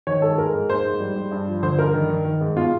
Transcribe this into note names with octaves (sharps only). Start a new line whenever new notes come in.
D#3 C#5
G#2 A4
G#3 A#4
G#2
A#3 C5
G#2
G3
G3
G2
F3
D3 C5
G2 A#4
D#3
D#3
D#3
G#2
B2 F4